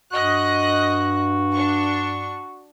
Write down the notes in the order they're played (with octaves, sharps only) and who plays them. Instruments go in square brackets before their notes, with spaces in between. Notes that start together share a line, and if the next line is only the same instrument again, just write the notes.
[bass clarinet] G2 [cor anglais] F#4 [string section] D#5 F#6
[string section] D4 C#6